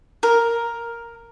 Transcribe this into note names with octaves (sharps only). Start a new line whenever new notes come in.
A#4